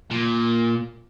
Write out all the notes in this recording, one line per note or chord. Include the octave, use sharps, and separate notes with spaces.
A#2